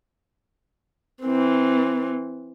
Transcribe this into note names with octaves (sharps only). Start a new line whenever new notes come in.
E3 C4